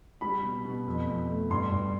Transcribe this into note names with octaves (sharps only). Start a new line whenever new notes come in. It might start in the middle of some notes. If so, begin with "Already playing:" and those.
G3 B5
B2
B2
F2
F2
A3
G2 C6
G2